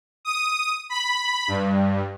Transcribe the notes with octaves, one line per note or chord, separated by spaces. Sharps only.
D#6
B5
G2